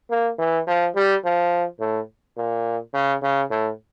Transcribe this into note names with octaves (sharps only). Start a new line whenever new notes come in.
A#3
E3
F3
G3
F3
A2
A#2
C#3
C#3
A2